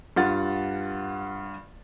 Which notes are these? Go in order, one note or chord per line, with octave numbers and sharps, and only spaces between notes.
G2 F4 F#5 A6